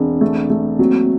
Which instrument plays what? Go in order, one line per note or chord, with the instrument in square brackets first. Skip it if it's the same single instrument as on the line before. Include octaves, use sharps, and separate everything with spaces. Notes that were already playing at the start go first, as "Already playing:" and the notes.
Already playing: [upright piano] E1 [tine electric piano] C4 D4
[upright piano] A3
A3
[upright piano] F#3 [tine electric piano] A#3 C4